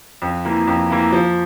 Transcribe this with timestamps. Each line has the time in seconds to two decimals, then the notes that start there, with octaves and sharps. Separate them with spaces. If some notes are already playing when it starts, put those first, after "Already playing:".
0.22 F2
0.45 E3 A#3
0.67 F2
0.90 E3 A#3
1.12 F3